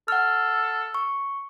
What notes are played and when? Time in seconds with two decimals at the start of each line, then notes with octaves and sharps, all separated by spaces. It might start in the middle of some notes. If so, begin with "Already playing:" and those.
0.08 A4 F#5 F6
0.94 C#6